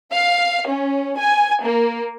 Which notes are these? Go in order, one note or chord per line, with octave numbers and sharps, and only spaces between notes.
F5
C#4
G#5
A#3